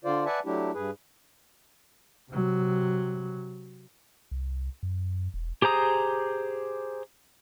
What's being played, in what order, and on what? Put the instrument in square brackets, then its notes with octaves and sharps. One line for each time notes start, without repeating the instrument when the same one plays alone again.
[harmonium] D3 F4 C5 D5
B4 D5 E5 F#5 G#5 A5
F#3 A3 D4 E4 G4
G2 G#4 B4
[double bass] C3 F#3
[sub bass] C2
F#2
E1
[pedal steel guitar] G4 G#4 C5 A#5 D#6